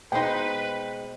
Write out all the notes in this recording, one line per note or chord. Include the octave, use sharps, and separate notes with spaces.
B2 G#3 D#4 B4 C5 G5 G6